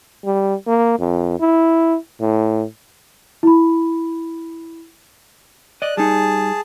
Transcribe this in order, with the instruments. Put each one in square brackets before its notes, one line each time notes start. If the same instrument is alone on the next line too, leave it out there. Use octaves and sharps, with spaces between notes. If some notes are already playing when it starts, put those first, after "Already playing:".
[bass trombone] G3
A#3
F2
E4
A2
[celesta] E4 B5
[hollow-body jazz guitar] D5 D#5 [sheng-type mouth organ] F#6
[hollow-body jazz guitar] G3 D#4 [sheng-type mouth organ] G#4 A5